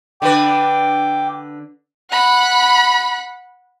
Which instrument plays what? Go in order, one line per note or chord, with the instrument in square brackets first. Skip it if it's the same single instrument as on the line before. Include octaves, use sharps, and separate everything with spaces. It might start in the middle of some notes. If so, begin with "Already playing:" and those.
[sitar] D3 D4 B4 [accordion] G5 D6
[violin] F#5 B5